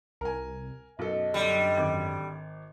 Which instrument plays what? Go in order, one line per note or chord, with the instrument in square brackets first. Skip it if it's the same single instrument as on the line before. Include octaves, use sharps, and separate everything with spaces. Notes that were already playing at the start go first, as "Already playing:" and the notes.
[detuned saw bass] C2 [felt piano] A#4 G#5
[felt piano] B1 A4 [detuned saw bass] F#2 [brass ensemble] D#5
[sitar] D3 G3
[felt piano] G#1 D6